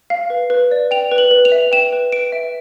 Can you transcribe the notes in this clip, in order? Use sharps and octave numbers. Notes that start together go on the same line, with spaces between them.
F5
B4
B4
D5
G5 F7
B4
F#7
B4
F7
E5
G5 E7
B4
B4 D7
E5